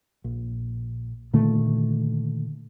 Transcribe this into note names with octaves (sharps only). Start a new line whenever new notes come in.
A#1
A#2 D3 D#3 A3